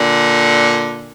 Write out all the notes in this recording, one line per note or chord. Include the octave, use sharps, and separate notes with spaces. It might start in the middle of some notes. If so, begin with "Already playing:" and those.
Already playing: A#2 D3